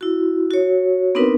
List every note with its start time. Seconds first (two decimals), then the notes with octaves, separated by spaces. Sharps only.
0.01 E4 F#4
0.51 F#4 C#5
1.15 B3 C4 D4 D#4 A#4 B4